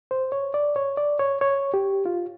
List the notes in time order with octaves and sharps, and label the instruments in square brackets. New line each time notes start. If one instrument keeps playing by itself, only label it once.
[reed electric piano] C5
C#5
D5
C#5
D5
C#5
C#5
G4
F4